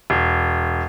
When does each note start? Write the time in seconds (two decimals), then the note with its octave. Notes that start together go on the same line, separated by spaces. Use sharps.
0.10 E1